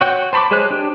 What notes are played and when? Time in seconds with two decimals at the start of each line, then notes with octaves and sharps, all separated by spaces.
0.01 F#4 C#5 G5
0.33 C5 A5 B5 C#6 D6
0.51 G#3 G#4 C5 C#5 F#6
0.70 D4 G4